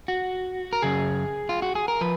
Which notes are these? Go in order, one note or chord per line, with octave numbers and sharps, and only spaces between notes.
F#4
A#4
F#2 C#3 G#4
F4
F#4
G#4
A#4
F3 B4